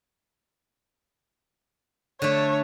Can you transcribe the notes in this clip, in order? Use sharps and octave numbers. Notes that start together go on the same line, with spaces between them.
D3 A3 C#5